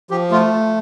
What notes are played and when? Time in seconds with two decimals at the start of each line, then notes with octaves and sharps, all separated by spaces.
0.11 F3 G4
0.31 A3 F4